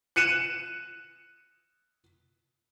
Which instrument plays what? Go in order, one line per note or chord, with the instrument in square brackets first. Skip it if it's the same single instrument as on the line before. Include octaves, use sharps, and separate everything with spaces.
[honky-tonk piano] F#6 C#7 D#7 E7